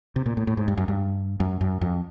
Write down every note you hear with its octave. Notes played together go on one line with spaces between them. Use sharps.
C3
A#2
A2
A2
G#2
G2
F#2
G2
F#2
F#2
F2